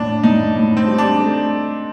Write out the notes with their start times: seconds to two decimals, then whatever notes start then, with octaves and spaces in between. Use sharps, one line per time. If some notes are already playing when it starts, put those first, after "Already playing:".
Already playing: A2 D4
0.23 A2 D#4
0.56 A2
0.77 C4
0.87 G3
0.98 D4
1.19 A3